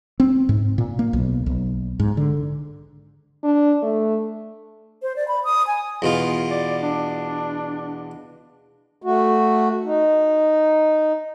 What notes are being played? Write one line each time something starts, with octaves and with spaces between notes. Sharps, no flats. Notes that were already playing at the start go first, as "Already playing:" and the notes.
C4
G#2
A#2
A#3
B1
B1
G#2
D3
D4
A3
C5
D5
B5
D#6
G#5
E2 B2 F4
D5
D4
A3 F#4
D#4